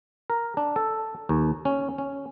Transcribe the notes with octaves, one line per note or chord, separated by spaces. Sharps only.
A#4
D4
A4
D#2
C#4
C#4